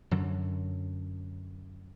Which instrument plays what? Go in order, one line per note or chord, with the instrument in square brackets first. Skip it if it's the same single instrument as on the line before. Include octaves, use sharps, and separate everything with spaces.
[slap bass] F#2 D3 F#3